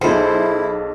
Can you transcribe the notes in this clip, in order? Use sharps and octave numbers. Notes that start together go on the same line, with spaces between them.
B1 E4 F4 G#4 A4 C5